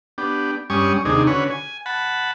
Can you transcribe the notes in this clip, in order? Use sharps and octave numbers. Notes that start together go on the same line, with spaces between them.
B3 D4 G4
G2 G3 C#4 G#5 C#6 D#6
D#2 C3 D4 D#4 G#4
D3 C#4 F#4 B4 C#5
G#5
F#5 A5 B5